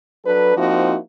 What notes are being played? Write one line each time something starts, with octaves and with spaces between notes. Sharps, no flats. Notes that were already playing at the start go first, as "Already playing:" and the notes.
F#3 D4 A4 B4
F3 A#3 C4 D#4 E4 F#4